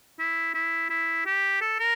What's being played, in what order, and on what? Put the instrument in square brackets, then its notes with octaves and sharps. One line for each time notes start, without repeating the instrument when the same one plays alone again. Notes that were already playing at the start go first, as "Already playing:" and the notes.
[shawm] E4
E4
E4
G4
A4
A#4